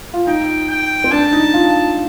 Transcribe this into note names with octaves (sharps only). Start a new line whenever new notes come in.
F4
D#4 G5
G5
C4
D4 A5
D#4
F4